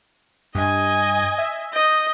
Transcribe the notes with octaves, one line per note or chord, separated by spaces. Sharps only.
G2 D#5 G#5
E5
D#5 G6